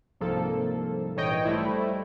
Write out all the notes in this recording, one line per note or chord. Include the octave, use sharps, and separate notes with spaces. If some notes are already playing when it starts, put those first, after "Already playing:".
C2 G#2 F3 A#3 A4
A#1 G#2 E3 C#5 D#5 G5
G3 A3 E4 C5